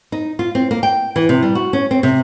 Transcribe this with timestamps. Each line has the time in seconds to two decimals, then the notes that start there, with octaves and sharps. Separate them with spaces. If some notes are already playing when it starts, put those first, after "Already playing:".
0.12 D#4
0.39 F4
0.55 C4
0.71 A#3
0.83 G5
1.16 E3
1.29 C3
1.43 G3
1.55 F#4
1.73 C#4
1.91 C4
2.03 C3